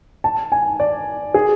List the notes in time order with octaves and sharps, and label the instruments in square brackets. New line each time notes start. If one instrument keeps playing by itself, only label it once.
[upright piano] A5
G#5
D5
G#4